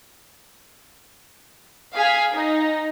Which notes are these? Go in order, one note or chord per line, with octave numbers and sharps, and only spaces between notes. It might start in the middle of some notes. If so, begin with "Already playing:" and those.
G#4 F5 G#5 F6 G#6 B6
D#4